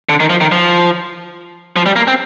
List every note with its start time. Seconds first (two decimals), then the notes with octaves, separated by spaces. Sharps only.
0.09 D3
0.20 D#3
0.30 F3
0.41 D#3
0.52 F3
1.76 F3
1.86 G3
1.96 A#3
2.08 C4